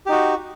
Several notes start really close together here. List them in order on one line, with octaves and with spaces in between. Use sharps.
G4 D#4 F#4